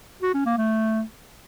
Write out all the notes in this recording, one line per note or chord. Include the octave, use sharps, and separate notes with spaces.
F#4
C#4
A#3
A3